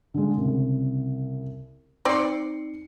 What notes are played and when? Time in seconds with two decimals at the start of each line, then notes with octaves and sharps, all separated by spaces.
0.14 D3 G#3
0.33 C2 C#3
2.05 C4 D#4 D5 C7 C#7